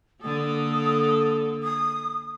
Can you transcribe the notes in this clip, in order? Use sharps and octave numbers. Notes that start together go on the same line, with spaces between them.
D3 A#3 A4 D#6
D#6